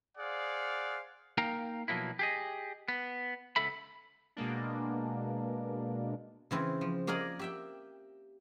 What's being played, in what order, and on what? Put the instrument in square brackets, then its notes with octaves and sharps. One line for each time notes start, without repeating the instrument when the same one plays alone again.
[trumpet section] G#4 C5 D5 F5 F#5
[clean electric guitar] A#3 D#4 A#4 F5 G5 A#5
B2 F3 F#3 A#3 E4
G4 G#4 D#5
B3
C#2 B3 A4 E5 B5
[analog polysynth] B2 G#3 A#3 D4
[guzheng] C#3 E3 C4
F3
A#3 G#4 A#4 D5 D#5
G4 E5 G5